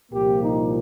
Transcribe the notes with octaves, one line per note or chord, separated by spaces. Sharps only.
C2 A#2 F3 A#3 G4
D#4